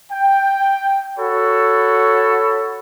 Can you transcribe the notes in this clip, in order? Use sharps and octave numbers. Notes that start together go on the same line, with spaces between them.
G5
F#4 A4 C#5 B5